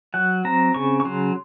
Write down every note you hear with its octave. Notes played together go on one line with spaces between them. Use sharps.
F#3 F#5
C4 A#5
C#3 C#6
C#6
F#3 C6